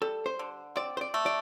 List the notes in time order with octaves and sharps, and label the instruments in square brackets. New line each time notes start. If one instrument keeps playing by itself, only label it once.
[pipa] G3 [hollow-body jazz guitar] A4
[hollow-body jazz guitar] C5
[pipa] D3
[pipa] C4 [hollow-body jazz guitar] D5
[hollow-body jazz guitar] C5
D5
[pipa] A3
[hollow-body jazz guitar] D5